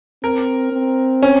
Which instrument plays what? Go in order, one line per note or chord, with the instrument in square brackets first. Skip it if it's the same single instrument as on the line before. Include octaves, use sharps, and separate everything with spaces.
[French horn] C4 [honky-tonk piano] A#4
[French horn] C4
[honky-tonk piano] C#4